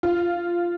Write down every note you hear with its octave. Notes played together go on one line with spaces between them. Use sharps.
F4